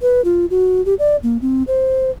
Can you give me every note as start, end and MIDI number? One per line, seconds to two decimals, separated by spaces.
0.02 0.24 71
0.24 0.46 65
0.50 0.84 66
0.85 0.95 67
0.99 1.16 74
1.23 1.38 58
1.42 1.63 60
1.68 2.11 72